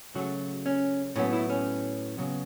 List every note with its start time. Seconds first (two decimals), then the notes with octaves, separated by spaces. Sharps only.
0.15 C#3 F#3 A3 F#4
0.66 C#4
1.16 A2 F#3 B3 C#4
1.33 E4
1.50 C#4
2.18 C#3 F#3 B3